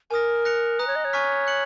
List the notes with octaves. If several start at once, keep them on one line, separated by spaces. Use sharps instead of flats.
A#4 G#5 D#6 A#6
F#6 A#6 C#7 F7
B4 A#5 D#6 F#6
C#5
D#5
C#5
G#5 C#6 F6 B6
F#6 C#7 F#7